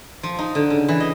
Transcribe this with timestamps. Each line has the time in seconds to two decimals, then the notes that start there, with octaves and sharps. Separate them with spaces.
0.23 F3
0.39 D#4
0.55 D3
0.70 C#3
0.88 E3
1.00 D#5